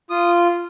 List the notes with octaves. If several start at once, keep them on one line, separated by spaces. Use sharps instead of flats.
F4 D#6